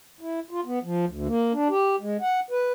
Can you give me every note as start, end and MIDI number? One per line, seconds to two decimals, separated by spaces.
0.21 0.40 64
0.51 0.61 65
0.66 0.79 59
0.83 1.05 53
1.07 1.27 38
1.27 1.53 58
1.53 1.68 62
1.69 1.96 67
2.00 2.17 56
2.21 2.40 78
2.51 2.73 71